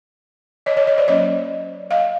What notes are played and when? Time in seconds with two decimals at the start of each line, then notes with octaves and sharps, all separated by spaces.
0.66 C#5 D#5
0.77 C#5 D#5
0.87 C#5 D#5
0.98 C5 D5
1.08 F#3 A#3 C#4 C#5 D#5
1.91 D#5 F5